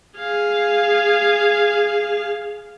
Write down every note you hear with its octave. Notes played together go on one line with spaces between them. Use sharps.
G#4 F5